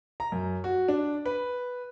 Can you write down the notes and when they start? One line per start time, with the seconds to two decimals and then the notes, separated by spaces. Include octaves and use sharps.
0.20 A#5
0.32 F#2
0.64 F#4
0.88 D4
1.26 B4